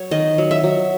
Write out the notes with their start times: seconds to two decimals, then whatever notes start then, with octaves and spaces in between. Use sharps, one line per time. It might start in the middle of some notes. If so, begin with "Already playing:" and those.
Already playing: F#3 C#5
0.11 D#3 D#5
0.38 F#3
0.51 E5
0.63 F#3